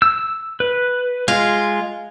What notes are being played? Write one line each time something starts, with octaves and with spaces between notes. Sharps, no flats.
E6
B4
G#3 F4